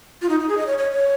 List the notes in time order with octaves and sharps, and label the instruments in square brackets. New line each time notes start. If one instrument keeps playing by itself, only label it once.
[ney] F4
D#4
D#4
G#4
D#5
C#5
C#5
C#5